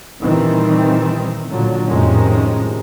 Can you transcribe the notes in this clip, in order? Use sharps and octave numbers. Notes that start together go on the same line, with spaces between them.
A#2 D#3 E3 G3 C4
A#2 D3 F#3
F2 A2 C3 D#3 G#3 C#4